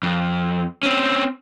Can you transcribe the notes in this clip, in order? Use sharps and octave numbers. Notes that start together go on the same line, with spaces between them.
F2
C4 C#4